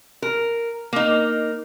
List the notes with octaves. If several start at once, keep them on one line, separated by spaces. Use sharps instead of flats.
A#4
A#3 D#4